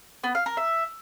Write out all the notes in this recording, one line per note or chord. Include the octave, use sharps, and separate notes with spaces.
B3
F5
A#4
E5